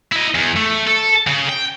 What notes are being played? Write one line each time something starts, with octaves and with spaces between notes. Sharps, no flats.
E4 D#5
E2
A3
A4
C#3
G5